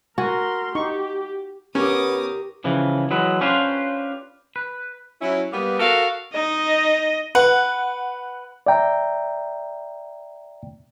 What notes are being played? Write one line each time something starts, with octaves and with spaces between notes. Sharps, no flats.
F#4 A#4 G#5 C6
D#4 G4 C#6
B3 C#4 G4 A#4 D6 D#6
C#3 E3 F3
E3 F#3 G#3 B4
C#4 D4 F4 G4 B4 C5
B4
F#3 C#4 E4
G3 A#3 B3
F#4 A4 A#4 F5
D#4 D#5
B4 F#5
D5 E5 G5 A#5